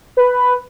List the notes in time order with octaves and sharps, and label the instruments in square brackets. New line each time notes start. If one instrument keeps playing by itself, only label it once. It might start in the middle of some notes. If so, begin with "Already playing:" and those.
[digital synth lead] B4